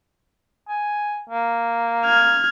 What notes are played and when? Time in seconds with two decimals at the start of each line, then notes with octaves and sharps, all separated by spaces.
0.68 G#5
1.29 A#3
2.06 F6 G#6